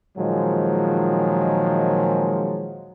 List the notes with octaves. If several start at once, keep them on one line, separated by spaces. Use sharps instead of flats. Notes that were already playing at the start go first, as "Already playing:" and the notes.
A#2 D#3 F3 F#3 G#3